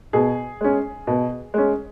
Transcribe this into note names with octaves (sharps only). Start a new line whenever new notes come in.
B2 G#4
G#3 C#4
B2
G#3 C#4